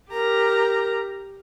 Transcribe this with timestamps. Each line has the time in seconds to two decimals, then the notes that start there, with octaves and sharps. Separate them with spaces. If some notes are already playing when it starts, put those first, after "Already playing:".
0.11 G4 A#4 A#5